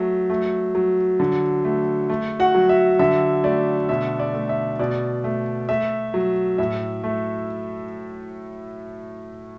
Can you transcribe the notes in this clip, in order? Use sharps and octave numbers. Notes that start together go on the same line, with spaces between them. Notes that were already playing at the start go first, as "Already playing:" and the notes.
Already playing: F#3 A3
A3
F#3
D3
A3
A3
F#4 F#5
F#3
E5
D3 E5
A3 D5
B2 E5
D5
A3
E5
B2 D5
A3
A3 E5
F#3
A2 E5
A3